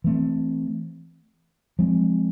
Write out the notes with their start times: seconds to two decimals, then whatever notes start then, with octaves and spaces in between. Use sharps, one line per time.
0.04 E3 A3 C4
1.79 F3 G#3 C4